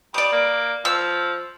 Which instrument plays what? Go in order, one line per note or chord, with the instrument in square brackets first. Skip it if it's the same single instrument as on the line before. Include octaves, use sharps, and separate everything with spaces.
[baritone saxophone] G3 [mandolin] D5 D#6
[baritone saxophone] A#3
[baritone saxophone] F3 [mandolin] E6